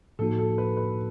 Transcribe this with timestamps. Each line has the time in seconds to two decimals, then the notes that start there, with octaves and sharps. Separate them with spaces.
0.19 A2 F3 A#3 D#4 F#4 A4
0.39 A4
0.58 B4
0.77 B4